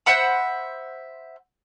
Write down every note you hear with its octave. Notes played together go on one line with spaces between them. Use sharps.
C5 E5 F#5 B5